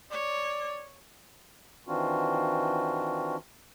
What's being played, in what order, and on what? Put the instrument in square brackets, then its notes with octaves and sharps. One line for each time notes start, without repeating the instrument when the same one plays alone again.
[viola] C#5 [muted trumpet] D5
[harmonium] D#3 E3 C4 D4 F4 F#4